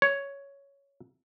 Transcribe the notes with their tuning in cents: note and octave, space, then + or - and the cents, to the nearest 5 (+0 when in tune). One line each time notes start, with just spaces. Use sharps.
C#5 +5